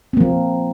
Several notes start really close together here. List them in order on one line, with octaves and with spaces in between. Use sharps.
C4 A#3 F3